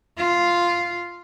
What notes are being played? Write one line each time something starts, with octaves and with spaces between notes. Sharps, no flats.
F4 F5